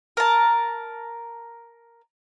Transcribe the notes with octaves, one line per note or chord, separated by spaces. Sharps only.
A#4 A5